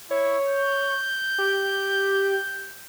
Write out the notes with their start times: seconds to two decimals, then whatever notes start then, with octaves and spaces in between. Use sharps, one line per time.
0.11 E4 C#5
0.48 G6
1.38 G4